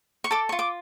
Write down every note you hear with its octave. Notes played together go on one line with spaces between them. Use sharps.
C#6
A4 D6
F4 C#6
D6